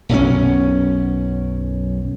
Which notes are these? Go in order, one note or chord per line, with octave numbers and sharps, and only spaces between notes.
B1 F#2 F#3 C#4